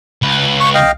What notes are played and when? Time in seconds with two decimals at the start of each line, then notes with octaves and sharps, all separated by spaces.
0.22 C#2 B4
0.60 C#6
0.74 D#5 F5 G5